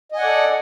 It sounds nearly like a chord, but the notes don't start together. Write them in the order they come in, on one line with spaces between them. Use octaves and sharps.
D#5 G#5 F#5 D5 A4